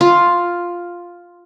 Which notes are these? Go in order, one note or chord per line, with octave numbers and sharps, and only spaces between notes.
F4